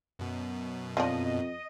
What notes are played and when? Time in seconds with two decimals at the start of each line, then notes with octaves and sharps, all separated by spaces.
0.19 F#2 B2
0.97 F2 F3 D4 D#5